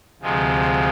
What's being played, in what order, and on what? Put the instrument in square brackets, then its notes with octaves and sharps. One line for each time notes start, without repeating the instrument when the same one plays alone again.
[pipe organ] D2 C3 F3 G#3